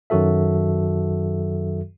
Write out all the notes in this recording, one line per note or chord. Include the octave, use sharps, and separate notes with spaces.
F#2 D#3 F#3 F#4 A4 E5